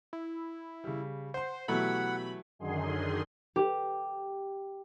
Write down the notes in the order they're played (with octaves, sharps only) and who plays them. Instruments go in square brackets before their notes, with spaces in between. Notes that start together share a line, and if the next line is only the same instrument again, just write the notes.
[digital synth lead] E4
[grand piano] C#3 G3
[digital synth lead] C5 [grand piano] F#5 C6
[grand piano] B2 G4 [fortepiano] E3 F#3 A3 [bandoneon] F#5 [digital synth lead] B5
[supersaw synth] F#2 D3 D#3 G#4 C6
[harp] G4